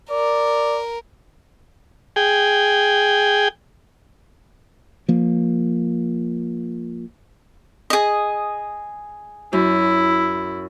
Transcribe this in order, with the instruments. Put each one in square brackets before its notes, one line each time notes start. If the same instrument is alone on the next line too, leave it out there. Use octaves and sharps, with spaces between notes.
[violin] A#4 [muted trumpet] D5
[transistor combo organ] G#4 G5
[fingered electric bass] F3 A#3
[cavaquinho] G#4 D#5
[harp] F#2 [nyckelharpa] E4